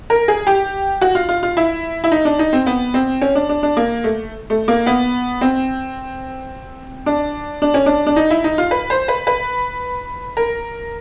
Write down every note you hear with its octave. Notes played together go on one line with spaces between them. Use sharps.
A#4
G#4
G4
F#4
F4
F4
F4
E4
E4
D#4
D4
D#4
C4
B3
C4
C#4
D4
D4
D4
A#3
A3
A3
A#3
B3
C4
D4
D4
C#4
D4
D4
D#4
E4
D#4
F4
B4
C5
B4
B4
A#4